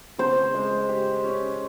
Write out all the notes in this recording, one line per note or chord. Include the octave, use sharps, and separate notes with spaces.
C#3 C5
G#3
G4
C#4